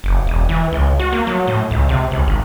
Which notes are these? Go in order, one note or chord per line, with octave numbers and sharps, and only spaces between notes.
F#1
E1
E3
C#2
F#4
A#3
F#3
A2
C#2
C3
C#2
G#1